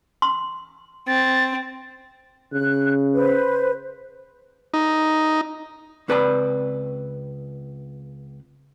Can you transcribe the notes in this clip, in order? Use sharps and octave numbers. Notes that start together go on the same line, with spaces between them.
C6
C4 A6
C#3 F#6
B4 C5
D#4
C#2 C4 B4 D5 A5 B5